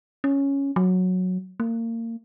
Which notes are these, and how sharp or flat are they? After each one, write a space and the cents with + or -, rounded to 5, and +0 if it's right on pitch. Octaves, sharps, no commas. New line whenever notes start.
C#4 +0
F#3 -10
A#3 -30